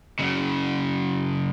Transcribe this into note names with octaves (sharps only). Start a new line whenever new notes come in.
F#2 C#3